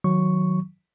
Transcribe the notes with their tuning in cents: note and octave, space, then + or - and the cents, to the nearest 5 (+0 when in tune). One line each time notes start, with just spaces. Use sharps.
D#3 +15 F#3 -5 C#6 +0